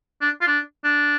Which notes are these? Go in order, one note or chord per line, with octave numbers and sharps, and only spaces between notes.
D4
F4
D4
D4